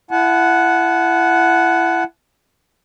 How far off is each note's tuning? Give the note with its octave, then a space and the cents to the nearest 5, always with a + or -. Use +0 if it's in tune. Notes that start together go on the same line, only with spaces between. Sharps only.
E4 +30 F#5 +0 A5 -35